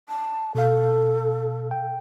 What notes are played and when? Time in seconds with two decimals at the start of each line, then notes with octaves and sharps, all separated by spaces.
0.08 A5
0.55 B2 A4 F5
1.71 G5